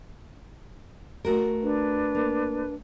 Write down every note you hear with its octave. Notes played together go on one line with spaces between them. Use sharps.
A3 F#4 A#4
D4 B4
A#3